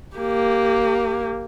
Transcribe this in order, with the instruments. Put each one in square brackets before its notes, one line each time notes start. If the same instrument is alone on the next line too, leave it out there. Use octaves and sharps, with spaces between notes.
[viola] A#3 G4